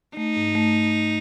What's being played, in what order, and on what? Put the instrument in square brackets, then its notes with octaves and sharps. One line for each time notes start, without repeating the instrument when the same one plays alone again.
[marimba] A3 [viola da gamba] D#4
[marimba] G#2
A3